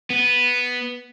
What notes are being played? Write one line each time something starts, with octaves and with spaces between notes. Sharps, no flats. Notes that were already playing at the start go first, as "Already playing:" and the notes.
B3